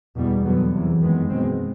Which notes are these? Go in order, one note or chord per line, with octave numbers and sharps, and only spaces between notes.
E2 B2 G3 B3
F2 D3 F#3 B3
E2 C3 E3
F#2 D#3 G#3 B3
B2 G#3 C4